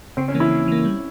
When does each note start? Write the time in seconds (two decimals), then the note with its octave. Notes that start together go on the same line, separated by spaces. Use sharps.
0.17 C#3 C4
0.28 C#4
0.35 E3 A#3
0.40 E4
0.51 C#3
0.68 E3 A#3
0.85 G3